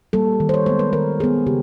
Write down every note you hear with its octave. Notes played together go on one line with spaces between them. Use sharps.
G3 A#3 A4
D#3
C5
C#5
G#3 B3 C5
B4
D#3 A#4
G#3 B3 G#4
C#3 G4